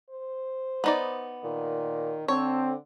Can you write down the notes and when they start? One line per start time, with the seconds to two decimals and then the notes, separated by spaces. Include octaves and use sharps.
0.10 C5
0.84 B3 D#4 D5
1.44 A#2 D#3
2.28 D3 C4 A4 C#5